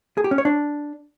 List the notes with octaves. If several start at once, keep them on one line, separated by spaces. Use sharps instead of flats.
G#4
G4
C#4
C#5
D4